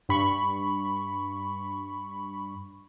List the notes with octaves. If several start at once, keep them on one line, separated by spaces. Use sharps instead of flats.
G2 B5 C#6